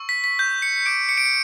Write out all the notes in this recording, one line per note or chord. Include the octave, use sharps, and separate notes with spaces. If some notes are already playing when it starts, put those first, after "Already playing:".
Already playing: C#6 E6
B6
B6
G6
C#7
D6 G6 D7
C#7
D7
C#7